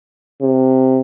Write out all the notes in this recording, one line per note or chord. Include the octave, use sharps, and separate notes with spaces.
C3